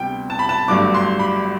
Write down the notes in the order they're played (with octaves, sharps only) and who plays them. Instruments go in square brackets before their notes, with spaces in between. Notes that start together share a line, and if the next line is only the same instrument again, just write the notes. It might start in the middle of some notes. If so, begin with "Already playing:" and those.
Already playing: [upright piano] D2 C3 G3 B3 G5
A5
B5
A5
G1 G2 F#3 A3 D4 D6
C6
B5